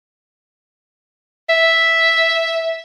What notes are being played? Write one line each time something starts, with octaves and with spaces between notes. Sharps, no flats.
E5